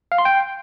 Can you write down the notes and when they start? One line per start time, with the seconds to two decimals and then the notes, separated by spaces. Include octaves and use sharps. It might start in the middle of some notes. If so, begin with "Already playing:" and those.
0.12 F5
0.18 C6
0.25 G5